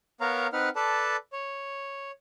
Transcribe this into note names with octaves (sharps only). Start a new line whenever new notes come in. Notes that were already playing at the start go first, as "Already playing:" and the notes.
B3 A#4 C#5 F5 A#5
C4 D#4 B4 F#5 F6
A4 B4 D5 A5
C#5